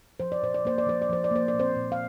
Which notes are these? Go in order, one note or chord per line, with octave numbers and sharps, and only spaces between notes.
F3 C5
D5
A#2 C5
D5
A#3 C5
D5
F3 C5
D5
F3 C5
D5
A#3 C5
D5
A#2
C4 C5
A#2
F5